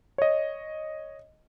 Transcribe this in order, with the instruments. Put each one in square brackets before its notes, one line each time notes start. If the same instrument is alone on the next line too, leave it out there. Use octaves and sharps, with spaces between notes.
[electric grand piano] C#5 D#5